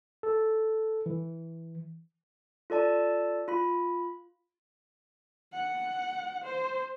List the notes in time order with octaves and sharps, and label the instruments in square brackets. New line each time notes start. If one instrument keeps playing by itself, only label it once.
[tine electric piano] A4
E3
[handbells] F4 A4 D5 A5
F4 B5
[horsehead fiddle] F#5
C5